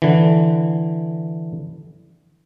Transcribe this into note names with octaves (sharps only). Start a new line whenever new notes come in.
D3 E3